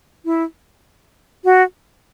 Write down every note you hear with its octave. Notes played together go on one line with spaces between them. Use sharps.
E4
F#4